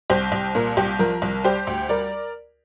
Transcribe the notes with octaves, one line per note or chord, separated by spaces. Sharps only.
C2 G4 C5
C2
A#2 A#4
C2 G4
F3 A#4
C2
G3 G4 C5
D2
G3 A#4 D5